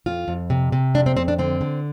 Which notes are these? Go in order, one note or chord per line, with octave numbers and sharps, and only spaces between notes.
F2 F4
F2
C3
C3
F2 D4
C4
F2 C4
D4
D3 C4
D3